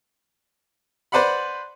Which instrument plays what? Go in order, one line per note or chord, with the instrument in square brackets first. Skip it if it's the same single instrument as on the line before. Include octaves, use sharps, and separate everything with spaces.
[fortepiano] B4 C5 D5 F#5 B5